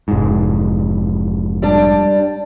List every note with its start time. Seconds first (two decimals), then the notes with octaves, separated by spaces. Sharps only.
0.08 F1 G#2
1.62 G3 D4